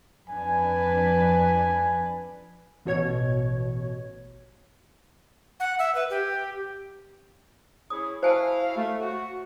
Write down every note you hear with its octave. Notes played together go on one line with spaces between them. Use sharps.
F2 D4 B4 G#5
A1 B2 C#5 G#6
F#5
E5
B4
G4
C#4 E4 G#4 D#6
E4 F#4 C5 F5 G#5 A5
A3
F#4